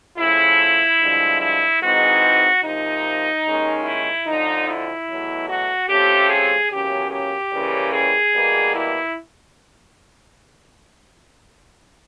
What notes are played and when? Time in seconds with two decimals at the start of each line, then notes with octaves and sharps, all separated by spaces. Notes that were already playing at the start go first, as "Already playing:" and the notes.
0.18 C#3 F3 A3 E4
0.99 G2 D3 F3 G#3
1.40 E4
1.82 G#2 E3 G#3 C4 D#4 F#4
2.62 C3 F3 A#3 D#4
3.44 D#2 D#3 G#3 C#4
3.85 E4
4.26 F2 D3 F3 D#4
4.67 E4
5.07 E2 B2 F#3 A3
5.48 F#4
5.88 C3 F3 A3 C#4 G4
6.29 G#4
6.70 E2 C#3 F#3 A#3 C#4 G4
7.11 G4
7.51 C#3 E3 G3 A#3 C#4
7.92 G#4
8.34 E2 B2 G3 A#3
8.74 E4